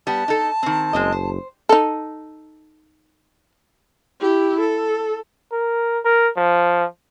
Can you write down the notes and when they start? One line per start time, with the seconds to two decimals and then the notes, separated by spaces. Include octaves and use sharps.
0.07 G3 B3 A5
0.28 D#4 A4
0.63 D#3 C4
0.93 F#1 G#3 C4 D#5
1.12 C5
1.69 D#4 A4
4.21 E4 G4
4.60 A4
5.53 A#4
6.05 A#4
6.37 F3